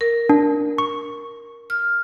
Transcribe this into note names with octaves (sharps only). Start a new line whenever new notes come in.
A#4
D4
C#6
F6